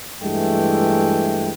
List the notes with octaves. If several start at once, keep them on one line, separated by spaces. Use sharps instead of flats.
G2 E3 G#3 A3 G5